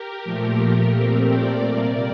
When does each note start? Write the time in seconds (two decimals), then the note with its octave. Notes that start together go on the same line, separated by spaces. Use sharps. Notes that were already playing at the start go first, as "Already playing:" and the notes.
Already playing: G4 A#4
0.24 A#2 F3 A3
0.97 A#2 A3 C4
1.33 A#4 D5
1.70 C3 G3 A#3